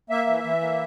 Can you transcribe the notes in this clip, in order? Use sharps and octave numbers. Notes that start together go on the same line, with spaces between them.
A#3 E5
E3
E3
A#3